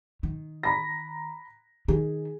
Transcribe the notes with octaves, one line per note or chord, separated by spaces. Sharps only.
D#3
A#5 B5 A#6
D#3 G#4